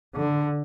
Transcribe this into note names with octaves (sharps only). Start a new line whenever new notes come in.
D3